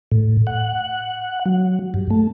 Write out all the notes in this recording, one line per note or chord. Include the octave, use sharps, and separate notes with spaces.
A2
F#5
F#3
G2
A3